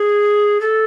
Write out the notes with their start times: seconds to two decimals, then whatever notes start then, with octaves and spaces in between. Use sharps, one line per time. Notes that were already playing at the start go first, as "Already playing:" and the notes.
Already playing: G#4
0.61 A4